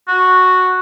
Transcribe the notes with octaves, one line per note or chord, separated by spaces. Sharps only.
F#4